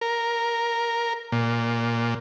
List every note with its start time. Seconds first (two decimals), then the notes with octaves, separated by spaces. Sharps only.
0.01 A#4
1.32 A#2